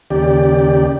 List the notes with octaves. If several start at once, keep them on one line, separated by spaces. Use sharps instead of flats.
D#2 C#3 G4 D5